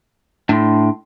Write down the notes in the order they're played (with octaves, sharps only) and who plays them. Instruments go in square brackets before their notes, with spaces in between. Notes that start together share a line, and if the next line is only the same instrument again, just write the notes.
[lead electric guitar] A2 [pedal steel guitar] D4 C6